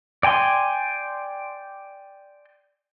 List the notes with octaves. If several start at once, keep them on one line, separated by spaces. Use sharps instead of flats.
D5 G5 G#5 C6